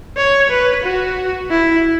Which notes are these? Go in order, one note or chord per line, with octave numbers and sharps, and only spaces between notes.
C#5
B4
F#4
E4